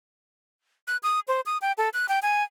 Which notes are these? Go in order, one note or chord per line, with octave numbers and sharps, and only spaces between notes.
F#6
D#6
C5
D#6
G5
A4
F#6
G5
G#5